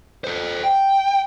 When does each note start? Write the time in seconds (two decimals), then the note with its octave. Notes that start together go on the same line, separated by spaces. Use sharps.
0.24 A4 C5
0.63 G5